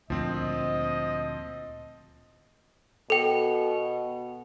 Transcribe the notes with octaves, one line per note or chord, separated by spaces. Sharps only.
D2 A#2 F3 C4 D#5
B2 A4 G5